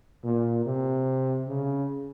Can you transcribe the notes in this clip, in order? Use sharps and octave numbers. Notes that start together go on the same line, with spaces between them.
A#2
C3
C#3